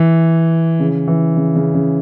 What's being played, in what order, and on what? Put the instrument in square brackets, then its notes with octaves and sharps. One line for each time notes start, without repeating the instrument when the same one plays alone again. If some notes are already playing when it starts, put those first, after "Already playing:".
Already playing: [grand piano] E3
C#3
E3
C#3
C#3
C#3